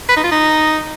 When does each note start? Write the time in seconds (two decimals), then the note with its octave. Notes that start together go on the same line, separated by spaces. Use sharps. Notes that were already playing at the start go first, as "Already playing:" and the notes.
0.09 B4
0.16 D#4
0.24 F4
0.31 D#4